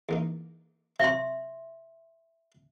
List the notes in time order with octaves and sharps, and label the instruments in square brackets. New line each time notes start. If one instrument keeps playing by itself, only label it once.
[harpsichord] E2 A#3 D#4
[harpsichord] C3 F#3 F4 [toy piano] E5 C6